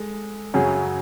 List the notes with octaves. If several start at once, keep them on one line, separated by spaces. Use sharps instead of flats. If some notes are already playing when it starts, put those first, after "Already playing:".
Already playing: G#3 A4
F#2 C#3 F#3 C#4 G#4